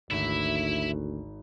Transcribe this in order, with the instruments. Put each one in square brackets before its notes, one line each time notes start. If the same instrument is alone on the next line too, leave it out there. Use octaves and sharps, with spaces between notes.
[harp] G#1 C#7 [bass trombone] D2 [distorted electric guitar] E4 E5